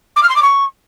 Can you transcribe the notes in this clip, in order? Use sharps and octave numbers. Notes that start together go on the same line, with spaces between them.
D6
F6
C6
D6
C#6